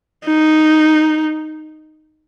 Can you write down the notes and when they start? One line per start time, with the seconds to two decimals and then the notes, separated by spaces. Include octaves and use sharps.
0.27 D#4